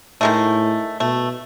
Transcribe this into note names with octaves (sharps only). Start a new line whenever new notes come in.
A2 D#3 G#3 A3
B2 A3